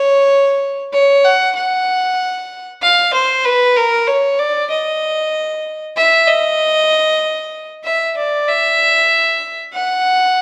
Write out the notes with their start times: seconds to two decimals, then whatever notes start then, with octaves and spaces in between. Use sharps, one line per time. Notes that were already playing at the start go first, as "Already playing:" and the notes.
Already playing: C#5
0.93 C#5
1.24 F#5
1.55 F#5
2.82 F5
3.13 C5
3.45 B4
3.76 A#4
4.07 C#5
4.39 D5
4.71 D#5
5.97 E5
6.28 D#5
7.84 E5
8.17 D5
8.48 E5
9.73 F#5